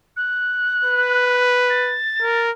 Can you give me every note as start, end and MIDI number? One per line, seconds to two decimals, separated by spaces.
0.16 1.45 90
0.85 1.98 71
1.70 2.43 93
2.22 2.51 70